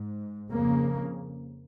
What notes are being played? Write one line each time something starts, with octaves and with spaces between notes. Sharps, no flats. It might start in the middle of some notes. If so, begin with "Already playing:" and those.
Already playing: G#2
F2 C#3 A#3